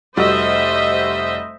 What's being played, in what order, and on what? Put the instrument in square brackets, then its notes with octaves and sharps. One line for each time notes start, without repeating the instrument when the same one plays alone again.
[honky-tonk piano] F1 G3 F#4 [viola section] C5 D#5 E5